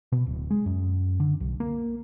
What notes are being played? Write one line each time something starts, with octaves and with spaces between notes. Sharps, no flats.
B2
D1
G#3
F#2
D3
B1
A#3